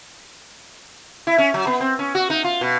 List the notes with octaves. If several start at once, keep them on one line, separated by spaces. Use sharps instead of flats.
E4
C#4
F#3
B3
C4
C#4
F#4
D#4
F4
B2